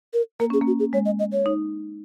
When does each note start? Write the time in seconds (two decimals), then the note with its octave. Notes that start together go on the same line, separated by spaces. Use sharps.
0.13 A#4
0.40 A#3 A#4
0.50 C#4 G#4
0.61 A#3
0.67 F#4
0.79 G#4
0.93 G#3 C#5
1.05 D#5
1.19 D#5
1.32 C#5
1.46 D#4